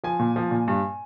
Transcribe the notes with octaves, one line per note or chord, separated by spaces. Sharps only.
F3 G#5
A#2
F3
A#2
G2